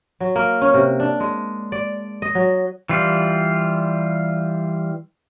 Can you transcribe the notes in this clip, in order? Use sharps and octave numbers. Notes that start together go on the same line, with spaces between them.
F#3
A#3
C#4
C3
D4
G#3
D5
D#5
F#3
E3 G3 F4